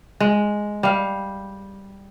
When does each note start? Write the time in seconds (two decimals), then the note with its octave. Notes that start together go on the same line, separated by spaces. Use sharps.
0.20 G#3
0.83 G3 F5